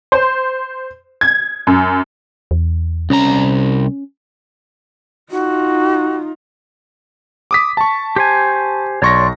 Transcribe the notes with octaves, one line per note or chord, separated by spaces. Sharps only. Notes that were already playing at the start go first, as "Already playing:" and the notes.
C5
G#6
F#2
E2
C2 C#4 A#5
D#4 F4 F#4
D6 D#6 B6
A5 C#6
G4 C5 G#5
B1 C#5 D5 C6 C#6 A#6